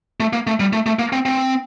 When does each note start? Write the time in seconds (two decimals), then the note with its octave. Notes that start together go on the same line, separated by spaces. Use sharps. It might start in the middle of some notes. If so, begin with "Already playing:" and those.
0.20 A3
0.33 A#3
0.47 A3
0.60 G3
0.73 A3
0.86 A3
0.99 A#3
1.13 C4
1.26 C4